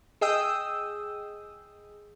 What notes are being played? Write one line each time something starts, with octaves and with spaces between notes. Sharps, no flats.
G#4 D#5 G5 D#6 E6